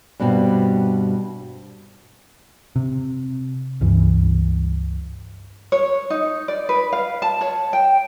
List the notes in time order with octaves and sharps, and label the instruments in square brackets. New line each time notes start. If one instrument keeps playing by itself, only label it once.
[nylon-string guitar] G2 B2 G3 C4
[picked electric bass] C3
C#2 G2 E3
[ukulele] C#5
D#4
D5
B4
F5
A5
C#5
G5